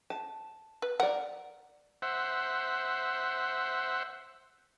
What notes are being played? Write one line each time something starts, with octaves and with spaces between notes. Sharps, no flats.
A5
B4
A#4 D5 F#5
C5 E5 F#5